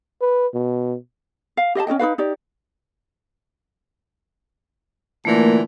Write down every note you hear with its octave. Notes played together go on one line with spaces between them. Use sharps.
B4
B2
F5
G4 D#5 F5 A5
C#4 F#4 D#5 G5
D#4 F#4 B4 F5
D#4 G4 D5
A#2 D3 E3 A3 A#3 A#4